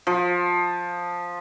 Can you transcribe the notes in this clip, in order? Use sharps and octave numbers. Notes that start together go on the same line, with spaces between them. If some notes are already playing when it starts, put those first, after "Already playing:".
F3